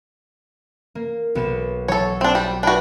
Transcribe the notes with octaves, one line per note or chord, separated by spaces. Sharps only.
A#3
B1 B3 E7
F#3 A4 C#5
C4 D4 E7
G3
D4 F#4 B4 G5 B5